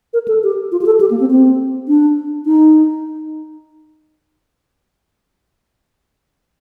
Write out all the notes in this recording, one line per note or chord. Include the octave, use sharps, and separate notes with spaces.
A#4
A4
G4
F4
G4
A4
G4
A#3
C4
C4
D4
D#4